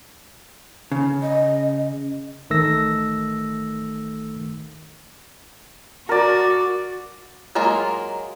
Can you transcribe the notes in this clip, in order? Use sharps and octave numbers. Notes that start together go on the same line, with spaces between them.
C#3
D#5
A1 D#3 A3 E6 A#6
F#4 A#4 D5
F#3 G#3 A#3 F4 A#4